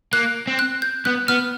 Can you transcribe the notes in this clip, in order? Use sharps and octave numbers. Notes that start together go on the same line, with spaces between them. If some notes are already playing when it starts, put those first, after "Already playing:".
A#3 F#6
C4
F#6
G6
B3 F#6
B3 F6